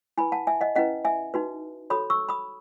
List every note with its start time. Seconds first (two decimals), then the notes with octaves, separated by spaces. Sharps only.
0.18 E4 B4 G#5 B5
0.32 F#5 A5
0.47 E5 G#5
0.61 D#5 F#5
0.75 C#4 E4 B4 D#5 F#5
1.05 E5 G#5
1.34 D#4 F#4 B4
1.90 F#4 A4 C#5 B5 D#6
2.10 C#6 E6
2.29 B5 D#6